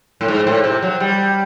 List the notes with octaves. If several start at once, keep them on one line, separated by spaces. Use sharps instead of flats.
A2
G#2
A2
C3
F#3
G3